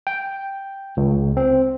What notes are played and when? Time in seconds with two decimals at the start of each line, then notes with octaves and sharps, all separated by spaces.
0.07 G5
0.97 C#2
1.37 C4